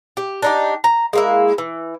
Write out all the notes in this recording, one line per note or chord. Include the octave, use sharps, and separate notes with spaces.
G4
D4 D#4 G4
A#5
G#3 A#3 E4
E3